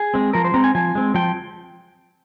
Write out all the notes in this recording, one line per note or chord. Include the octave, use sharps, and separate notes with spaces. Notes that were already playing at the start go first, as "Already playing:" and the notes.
Already playing: G#4
G#3 C4
F3 A#4
C5
G#3 C4 A#5
G#5
F3 G#5
G#3 C4
F3 G5